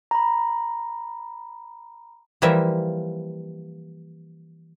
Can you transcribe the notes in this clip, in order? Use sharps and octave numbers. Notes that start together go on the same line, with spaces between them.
A#5 B5
E3 F3 G3 A#3 E5